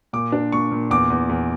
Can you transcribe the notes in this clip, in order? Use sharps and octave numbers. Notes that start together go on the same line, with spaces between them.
A#2 D6
D4
A#2 C#6
A#2
E2 D6
E2
E2